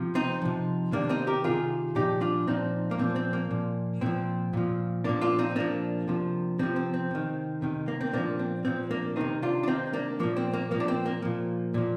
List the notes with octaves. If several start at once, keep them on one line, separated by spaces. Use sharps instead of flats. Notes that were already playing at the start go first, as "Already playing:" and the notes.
Already playing: C3 F3
C4 D#4
C3 F3
C3 D#3 A#3 D4
C4 D#4
G4 A#4
C3 D#3 F4 G#4
A#2 F3 D#4 G4
D4 F4
A#2 F3 C4 D#4
A#3
A#2 F3 C4
C4
A#3
A#2 F3
A#2 F3 C4
A#2 F3
A#2 F3 A#3 D4
D4 F4
C4 D#4
A#2 F3 A#3 D4
C3 F3
C3 F3 C4
C4
C4
C3 D#3
C3 D#3
A#3
C4
A#2 F3 A#3 D4
C4
A#2 F3 C4
A#3 D4
C3 D#3 C4 D#4
D4 F4
D4
C3 D#3 C4 D#4
A#3 D4
A#2 F3 A#3
C4
A#3
A#2 F3 A#3
D4
C4
A#3
A#2 F3
A#2 F3